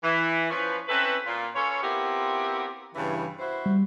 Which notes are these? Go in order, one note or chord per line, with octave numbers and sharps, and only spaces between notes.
E3
F3 C#4 B4
C4 C#4 E4 A4 B4
A#2 F4
C#4 F4 A4 B4 C#5
B3 C4 E4 F4 G4 A#4
G2 C#3 E3
E4 F#4 C5
G3